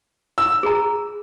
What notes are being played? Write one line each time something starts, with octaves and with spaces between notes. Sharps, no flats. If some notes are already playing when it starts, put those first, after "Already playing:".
E6
G#4 A#5